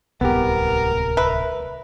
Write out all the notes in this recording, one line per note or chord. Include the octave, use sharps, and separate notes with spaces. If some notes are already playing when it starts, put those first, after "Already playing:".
D1 C2 B3 G4 A#4
B4 E5